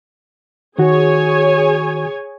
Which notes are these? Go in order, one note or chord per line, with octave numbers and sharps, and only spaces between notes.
D#3 F#4 G#4 C#5 G#5